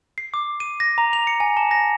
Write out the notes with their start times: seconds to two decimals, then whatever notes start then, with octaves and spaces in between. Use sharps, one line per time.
0.18 C7
0.34 D6
0.60 D#7
0.80 A#6
0.98 A#5
1.13 F7
1.27 C#7
1.40 G#5
1.57 A5
1.71 A#6